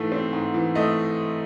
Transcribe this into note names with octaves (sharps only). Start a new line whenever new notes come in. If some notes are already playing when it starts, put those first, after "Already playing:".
Already playing: G#2 E3 A3
C4
G#2
E3
A3 D#5